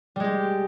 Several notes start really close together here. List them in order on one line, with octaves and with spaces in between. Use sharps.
G3 G#3 G4